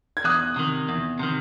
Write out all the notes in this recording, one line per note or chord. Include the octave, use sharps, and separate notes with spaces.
G#6
E2 D#6 F#6
C3 D#3
E2
C3 D#3